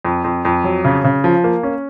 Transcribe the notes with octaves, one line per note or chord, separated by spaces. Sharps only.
F2
F2
F2
F#3
C#3
C#3
F3
A#3
C#4